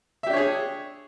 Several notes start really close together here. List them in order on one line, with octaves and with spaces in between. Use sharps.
E5 G4 D4 C#5 G#4